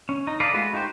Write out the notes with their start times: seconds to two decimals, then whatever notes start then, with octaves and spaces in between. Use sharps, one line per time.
0.09 C#4
0.27 D#4
0.40 A4 B4 D5 D#5 F5
0.54 G#3 A3 F4 F#4 B4
0.73 D#4 F#4 G4 C5